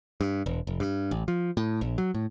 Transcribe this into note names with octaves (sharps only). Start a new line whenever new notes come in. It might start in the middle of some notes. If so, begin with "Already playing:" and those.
G2
E1
F1
G2
A1
F3
A2
A#1
F#3
A2